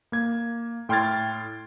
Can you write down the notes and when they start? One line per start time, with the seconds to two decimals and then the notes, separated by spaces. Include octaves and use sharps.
0.12 A#3 G#6
0.89 A2 G5 C6 F6 G#6 A6